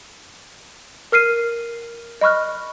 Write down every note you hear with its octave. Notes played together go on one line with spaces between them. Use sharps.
A#4 F6 C7 D#7
D#5 B5 C#6 F6 F#6